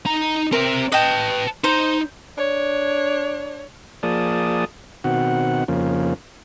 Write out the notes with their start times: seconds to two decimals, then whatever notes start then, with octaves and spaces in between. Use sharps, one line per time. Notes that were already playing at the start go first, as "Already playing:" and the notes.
0.06 D#4 A#5
0.52 C4 A#4 E5
0.92 B4 D#5 G5 A5
1.64 D#4 C5
2.38 D4 C#5
4.03 F3 A#3 G#4 D5 A5 D#6
5.04 B2 D#3 C4 F#4 F#5
5.68 F2 C#3 F3 A#3 C#4